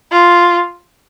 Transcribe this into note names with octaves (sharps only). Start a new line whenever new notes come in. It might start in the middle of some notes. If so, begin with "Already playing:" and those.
F4